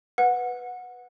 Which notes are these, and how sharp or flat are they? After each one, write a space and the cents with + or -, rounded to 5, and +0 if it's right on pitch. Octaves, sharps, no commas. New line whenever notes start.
B4 +0 F#5 -20